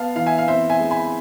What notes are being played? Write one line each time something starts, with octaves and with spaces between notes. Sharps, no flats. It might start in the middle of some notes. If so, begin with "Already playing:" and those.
Already playing: B3 F5 A5
E3 F5
E5 G#5
F5
C4 C5 E5
E5 G#5
G#3
G#5 B5